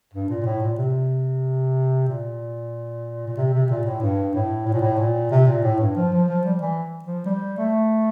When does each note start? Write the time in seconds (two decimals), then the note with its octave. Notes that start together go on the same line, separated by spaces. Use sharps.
0.14 G2
0.29 A#2
0.42 A#2
0.45 A2
0.62 A#2
0.78 C3
2.08 A#2
3.27 A#2
3.37 C3
3.53 C3
3.65 C3
3.70 A#2
3.86 A2
4.02 G2
4.34 A2
4.67 A2
4.74 A#2
4.81 A2
4.99 A#2
5.31 C3
5.47 A#2
5.64 A2
5.81 G2
5.96 F3
6.13 F3
6.28 F3
6.45 G3
6.61 E3
7.04 F3
7.26 G3
7.58 A3